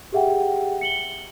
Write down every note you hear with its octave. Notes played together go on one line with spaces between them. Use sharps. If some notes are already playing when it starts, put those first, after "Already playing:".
G4 G#4 E5 F#5 G5
C#7 F#7 G7